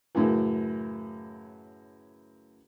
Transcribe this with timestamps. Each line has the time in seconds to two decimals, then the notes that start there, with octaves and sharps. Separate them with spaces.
0.15 F#2 A2 C#3 E3